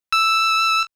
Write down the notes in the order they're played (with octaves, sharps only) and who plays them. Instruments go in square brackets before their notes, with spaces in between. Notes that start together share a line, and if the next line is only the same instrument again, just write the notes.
[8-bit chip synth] E6